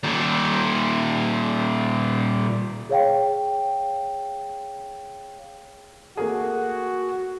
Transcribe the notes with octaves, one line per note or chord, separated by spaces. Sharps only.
A#2 D#3
G#4 C#5 F5 G5
A3 A#3 F#4 G#4